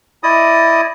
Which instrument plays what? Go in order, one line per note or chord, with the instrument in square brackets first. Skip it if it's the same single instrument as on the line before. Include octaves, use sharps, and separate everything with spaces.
[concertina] E4 D5 D#5 D#6